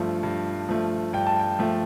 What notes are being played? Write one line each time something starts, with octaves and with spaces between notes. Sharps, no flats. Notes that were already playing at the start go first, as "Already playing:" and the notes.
Already playing: G2 F3 A3
G2
F3 A3
G2 G5
A5
G5
F3 A3